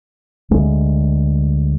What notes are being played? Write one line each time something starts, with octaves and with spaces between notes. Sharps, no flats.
D2 G#3